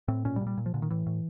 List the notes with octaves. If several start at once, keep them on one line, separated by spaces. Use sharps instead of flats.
A2 C4
A#2 C#4
G3
A#2
G3
A#2
F3
A#2 D3
D#3
A2 E3
A2